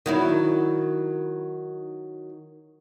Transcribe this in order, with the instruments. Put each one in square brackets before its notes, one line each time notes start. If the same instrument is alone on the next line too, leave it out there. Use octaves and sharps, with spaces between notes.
[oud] D#3 F#3 E4